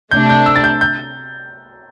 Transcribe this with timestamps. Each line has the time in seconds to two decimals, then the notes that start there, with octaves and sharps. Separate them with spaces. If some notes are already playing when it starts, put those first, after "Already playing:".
0.11 C3 A3 D4 G6
0.29 G6
0.46 E6
0.56 A6
0.64 G6
0.81 G6